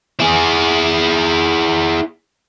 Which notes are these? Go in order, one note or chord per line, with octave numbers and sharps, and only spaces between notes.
E4 G#4